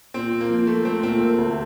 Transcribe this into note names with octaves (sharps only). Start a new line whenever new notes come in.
A#2 C4
A#2
A#3
F3
F3 A3
A3 C4
A#2 C4
A#3
D2